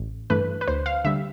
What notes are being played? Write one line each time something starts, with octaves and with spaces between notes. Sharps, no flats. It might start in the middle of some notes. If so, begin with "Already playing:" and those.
Already playing: A1
G2 E3 A3 B4
B4
D2 C5
F5
D3 G3 E5